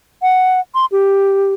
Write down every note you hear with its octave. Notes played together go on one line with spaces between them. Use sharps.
F#5
C6
G4